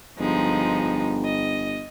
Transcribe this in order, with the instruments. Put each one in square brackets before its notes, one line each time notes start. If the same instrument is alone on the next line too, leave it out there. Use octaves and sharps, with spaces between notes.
[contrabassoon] G1 [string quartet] F3 G#3 D#4
[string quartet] D#5